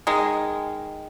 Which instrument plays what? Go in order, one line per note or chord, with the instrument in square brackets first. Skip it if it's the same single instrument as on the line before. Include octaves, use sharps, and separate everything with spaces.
[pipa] D#3 G#3